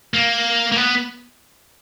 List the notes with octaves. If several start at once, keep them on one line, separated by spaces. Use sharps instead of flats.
A#3
A#3
B3